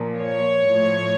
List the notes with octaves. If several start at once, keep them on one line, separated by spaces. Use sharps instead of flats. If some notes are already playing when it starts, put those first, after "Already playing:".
Already playing: A#2 F3
C#5
A2 F3